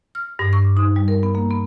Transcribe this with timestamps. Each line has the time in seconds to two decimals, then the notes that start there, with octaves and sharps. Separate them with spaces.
0.15 F6
0.39 G2
0.53 C#6
0.64 D6
0.77 D#4
0.96 G3
1.08 A#4
1.23 B3
1.35 A#3
1.50 B3